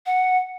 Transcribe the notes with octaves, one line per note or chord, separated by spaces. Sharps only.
F#5